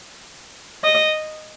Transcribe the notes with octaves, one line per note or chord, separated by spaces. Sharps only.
D#5